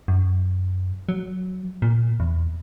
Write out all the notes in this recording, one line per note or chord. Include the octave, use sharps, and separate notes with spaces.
F#2
F#3
A#2
E2